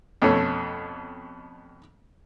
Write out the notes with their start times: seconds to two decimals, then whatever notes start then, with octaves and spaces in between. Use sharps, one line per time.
0.22 F2 B2 A3 C#4